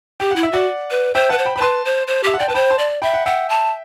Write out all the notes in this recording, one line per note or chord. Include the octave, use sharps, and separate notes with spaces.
G4 G5
E4 F#5
E5
F#4 D5 F#5
B4
C5 E5 G5
B4 F#5 A5
C5
G5 B5
C5 B5
B4 A5 C6
C5
C5
G4 E5
F#5
D5 G5
B4 A5
C5 G5 B5
A5 C6
D5
E5 G5 B5
F#5
E5 F#5 G5
A5